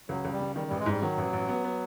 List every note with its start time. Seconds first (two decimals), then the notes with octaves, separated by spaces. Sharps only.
0.09 C#2 F#3
0.25 C#2
0.32 G3
0.40 C#3
0.56 D#3 G3
0.67 A1 G3
0.79 G#3
0.86 G#2 G3
1.02 D#3 F#3
1.18 A1
1.33 A1
1.49 B3
1.64 B3